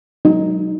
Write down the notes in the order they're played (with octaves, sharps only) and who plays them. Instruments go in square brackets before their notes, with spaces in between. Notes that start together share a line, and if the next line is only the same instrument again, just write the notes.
[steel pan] F#3 D#4